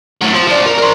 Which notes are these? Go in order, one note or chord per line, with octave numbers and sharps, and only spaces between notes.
A2 F#3
F3
F3 D5
A#4
A#4 C5